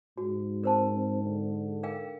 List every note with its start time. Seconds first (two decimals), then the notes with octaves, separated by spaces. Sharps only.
0.18 G#2 F#4
0.64 C4 A#4 C5 A5
0.94 C4
1.24 D3
1.83 A#4 F5 G5